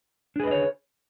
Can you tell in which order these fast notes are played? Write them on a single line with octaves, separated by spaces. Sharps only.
D4 G#4 B4 D#5 C#5